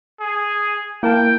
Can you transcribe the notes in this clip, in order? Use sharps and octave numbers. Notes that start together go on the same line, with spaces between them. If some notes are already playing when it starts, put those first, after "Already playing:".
G#4
A#3 E4 A#4 G5 A5